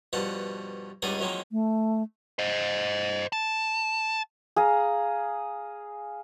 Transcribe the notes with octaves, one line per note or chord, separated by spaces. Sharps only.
G2 B2 F3 F#5 A5
C#2 G2 B3 D#4 G#4 D5
D#3 F3 F#3 G#3 A#3 C4
A3
C5 D#5
A5
G#4 F5 A#5